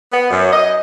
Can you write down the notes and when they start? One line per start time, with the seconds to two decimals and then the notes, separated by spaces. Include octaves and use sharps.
0.13 B3
0.31 F#2
0.52 D#5